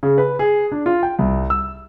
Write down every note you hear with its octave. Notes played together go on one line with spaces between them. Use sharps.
C#3
B4
G#4
D4
F4
G5
C2
E6